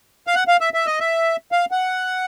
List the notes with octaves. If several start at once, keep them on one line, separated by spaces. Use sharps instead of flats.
F5
F#5
F5
E5
E5
D#5
E5
F5
F#5